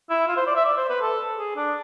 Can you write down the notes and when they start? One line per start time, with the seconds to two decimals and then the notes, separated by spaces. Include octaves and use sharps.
0.10 E4
0.28 F4
0.37 C5
0.47 D5
0.56 E5
0.65 D5
0.77 C5
0.90 B4
1.02 A4
1.38 G#4
1.56 D4